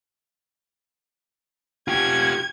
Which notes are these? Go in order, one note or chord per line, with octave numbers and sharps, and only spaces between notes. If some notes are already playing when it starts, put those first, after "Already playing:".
C#4 F4 G4 G#6